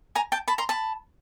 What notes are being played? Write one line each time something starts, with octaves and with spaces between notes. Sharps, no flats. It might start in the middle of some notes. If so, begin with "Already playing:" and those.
G#5 A#5
G5 A5
A5 B5
A#5 C6
A5 B5